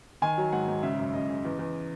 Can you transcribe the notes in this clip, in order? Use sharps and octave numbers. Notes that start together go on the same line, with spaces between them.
D#3 G#5
F#3
G#2 F#5
G#2
C#3 E5
F#2
F#2 D#5
C#3
E2
E2